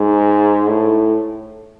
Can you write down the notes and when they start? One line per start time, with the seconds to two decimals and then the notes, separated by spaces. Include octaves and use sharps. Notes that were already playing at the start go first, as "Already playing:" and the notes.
Already playing: G#2
0.68 A2